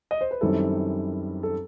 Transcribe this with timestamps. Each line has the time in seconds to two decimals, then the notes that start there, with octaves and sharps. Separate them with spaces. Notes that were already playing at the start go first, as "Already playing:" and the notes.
0.11 D#5
0.21 C5
0.31 B4
0.41 F#2 D#3 G3 C4 E4 A4
1.43 A4